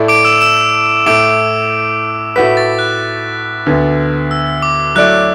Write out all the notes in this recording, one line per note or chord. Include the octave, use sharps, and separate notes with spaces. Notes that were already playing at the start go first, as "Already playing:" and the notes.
Already playing: A2 A3 E4 A4 D5
D6 D7
E6 E7
E6 E7
A2 A3 E4 D6 D7
A2 A3 F#4 B4 B6
A6
F#6
D2 D3 B3
E6
D6
F#3 A3 E4 D5 F#6